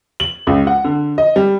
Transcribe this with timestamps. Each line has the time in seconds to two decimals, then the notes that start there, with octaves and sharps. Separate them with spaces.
0.20 F#7
0.47 C#2
0.67 F#5
0.85 D3
1.18 D#5
1.36 G3